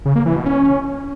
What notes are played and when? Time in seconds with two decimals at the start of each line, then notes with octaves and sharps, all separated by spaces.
0.05 C#3
0.15 A#3
0.26 E3
0.36 B2
0.46 C#4